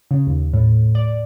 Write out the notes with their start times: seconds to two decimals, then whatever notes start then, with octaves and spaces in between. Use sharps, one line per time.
0.11 C#3
0.27 D#2
0.53 A2
0.95 D5